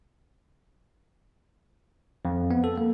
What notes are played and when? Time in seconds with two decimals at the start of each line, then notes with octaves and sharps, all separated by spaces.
2.25 F2
2.51 B3
2.64 A4
2.78 A#3